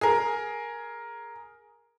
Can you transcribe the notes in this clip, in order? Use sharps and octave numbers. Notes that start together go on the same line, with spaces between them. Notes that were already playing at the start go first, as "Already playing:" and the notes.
G#4 A#4